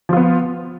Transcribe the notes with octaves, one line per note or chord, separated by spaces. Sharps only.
F3 B3 F4